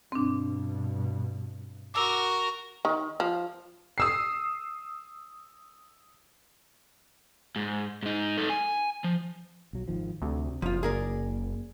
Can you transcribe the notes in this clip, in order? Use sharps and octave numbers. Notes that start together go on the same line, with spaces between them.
G2 B2 C4 D4
F#4 A#4 D6 E6
D#3
F3
D#6 E6 C7
G#2
G#2 D#4
D#4 A4
G#5
F3
B1 F#3
G#1 D#3 F3
D2 C3
F#1 F3 F4
F#2 A#3 G#4 A#4 D5